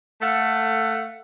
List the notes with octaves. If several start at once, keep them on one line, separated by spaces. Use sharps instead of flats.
A3 A4 F5 F#5